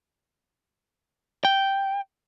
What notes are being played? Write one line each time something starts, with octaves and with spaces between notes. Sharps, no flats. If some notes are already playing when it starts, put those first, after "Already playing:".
G5